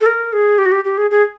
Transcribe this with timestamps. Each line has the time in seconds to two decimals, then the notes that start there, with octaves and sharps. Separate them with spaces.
0.01 A4
0.06 A#4
0.33 G#4
0.58 G4
0.66 F#4
0.72 G4
0.85 G4
0.97 G#4
1.11 G#4